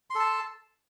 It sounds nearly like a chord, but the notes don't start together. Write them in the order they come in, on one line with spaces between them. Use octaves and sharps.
C6 A4 A5